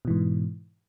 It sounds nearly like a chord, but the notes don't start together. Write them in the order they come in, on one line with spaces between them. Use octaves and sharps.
B2 E3 G#2